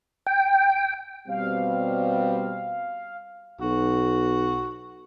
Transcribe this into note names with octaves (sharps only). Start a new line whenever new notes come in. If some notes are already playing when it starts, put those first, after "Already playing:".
G5
B2 G3 C4 F5
B1 F#4